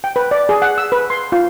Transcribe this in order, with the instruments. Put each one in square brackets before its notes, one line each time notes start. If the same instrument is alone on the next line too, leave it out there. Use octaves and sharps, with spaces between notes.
[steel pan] G5
B4
D5
G#4
F#5
E6
B4
C6
F4